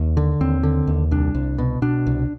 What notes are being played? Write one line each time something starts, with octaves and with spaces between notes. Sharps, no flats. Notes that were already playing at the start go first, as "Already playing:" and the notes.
Already playing: D#2
D3
D#2 C4
D3
D#2
C2 D4
C2
B2
B2 D4
C2